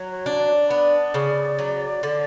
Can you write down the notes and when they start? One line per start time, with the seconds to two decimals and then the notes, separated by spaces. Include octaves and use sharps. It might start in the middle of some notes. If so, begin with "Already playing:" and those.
Already playing: F#3
0.11 C#5
0.26 D4
0.41 D5
0.70 B3 D5
1.14 C#3
1.59 F#3
2.03 D3